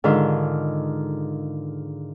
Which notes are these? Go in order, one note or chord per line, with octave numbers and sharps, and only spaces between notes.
G#2 D3 D#3 D4 F4